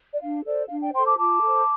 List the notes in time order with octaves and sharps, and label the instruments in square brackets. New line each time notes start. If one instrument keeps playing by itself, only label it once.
[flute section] D5
D4 F5
A4 C5 D5
D4 F5
D5 G5
A4 C5 G5 C6
A5 D6
F4 A5 D6
A4 C5